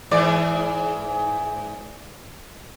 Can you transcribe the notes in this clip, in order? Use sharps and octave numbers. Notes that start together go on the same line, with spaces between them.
G#2 E3 D5